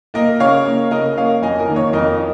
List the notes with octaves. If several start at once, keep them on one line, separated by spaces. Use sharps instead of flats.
A#3 A#4 D#5
C#3 C#5 F5
A#3
C#3 A#4 D#5
A#3 C#5 F5
F2 D#5 G#5
A#4 D#5
D#3 A#3
C#5
F2 A#4 D#5